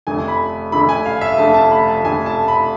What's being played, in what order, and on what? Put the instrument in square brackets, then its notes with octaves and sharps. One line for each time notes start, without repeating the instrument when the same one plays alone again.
[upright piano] F1 F2 D3 A3 G#5
B5
F1 F2 D3 A3 B5
G#5
F5
E5
F1 F2 D3 A3 A5
A5
B5
A5
F1 F2 D3 A3 G#5
A5
B5